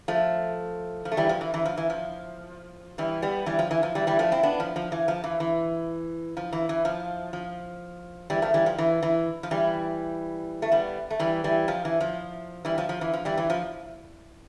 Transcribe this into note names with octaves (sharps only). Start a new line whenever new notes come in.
F3 A3
F3
A3
E3 G3
F3
E3
E3
F3
E3
F3
E3 G3
G3 B3
E3 G3
F3
E3
F3
E3 G3
E3 G3
F3 A3
C4 E4
B3 D4
F3
F3
E3
F3
E3
E3
F3
E3
E3
F3
F3
E3 G3
F3 A3
E3 G3
F3
E3
E3
F3
E3 G3
A3
G3 B3
A3
E3 G3
E3 G3
F3
E3
F3
E3 G3
F3
F3
E3
F3
E3 G3
E3
F3